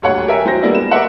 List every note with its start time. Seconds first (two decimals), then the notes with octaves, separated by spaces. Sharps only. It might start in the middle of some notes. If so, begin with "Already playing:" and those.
0.02 D#1 D2 C#5 F#5
0.27 G4 A#4 E5 G#5
0.46 F#3 C5 A#6
0.63 G3 G#3 A#3 B3 D4 E4
0.75 E7
0.91 A#4 D5 E5 F#5